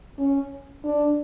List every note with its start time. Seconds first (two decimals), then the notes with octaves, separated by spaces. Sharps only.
0.19 C#4
0.84 D4